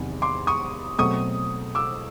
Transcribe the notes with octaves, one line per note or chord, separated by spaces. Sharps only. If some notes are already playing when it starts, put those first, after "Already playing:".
Already playing: E2 C3 D#3 F#3
C6 D6
C#6 D#6
B2 F#3 A3 C4 C#6 D#6
D6 E6